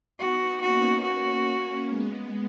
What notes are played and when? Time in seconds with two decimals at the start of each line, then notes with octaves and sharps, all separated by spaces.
0.19 B3 D#4 F#4
0.61 A#3 C#4 F#4
1.03 A#3 C#4 F#4
1.88 G#3 B3